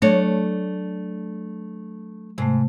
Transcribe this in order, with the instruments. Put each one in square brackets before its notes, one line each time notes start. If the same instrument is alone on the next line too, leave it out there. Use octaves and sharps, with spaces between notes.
[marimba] F#3 [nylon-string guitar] A3 D4 C#5
[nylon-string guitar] G#2 [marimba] C3 A3